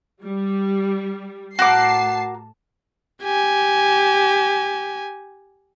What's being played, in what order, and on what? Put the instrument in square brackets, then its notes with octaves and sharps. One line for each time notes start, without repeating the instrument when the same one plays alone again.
[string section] G3
[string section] A2 A5 C7 [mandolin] F#4 A#4 D6
[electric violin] G4 G#5